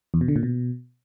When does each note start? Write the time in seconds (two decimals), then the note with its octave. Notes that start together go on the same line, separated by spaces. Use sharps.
0.14 E2
0.21 B2
0.28 D3
0.36 A#2
0.43 B2